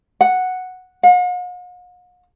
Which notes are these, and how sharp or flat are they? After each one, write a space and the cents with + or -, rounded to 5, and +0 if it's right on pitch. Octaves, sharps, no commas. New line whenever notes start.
F#5 -5
F#5 -45